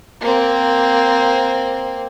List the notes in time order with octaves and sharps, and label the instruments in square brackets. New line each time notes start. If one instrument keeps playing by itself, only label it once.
[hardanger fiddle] A#3 C4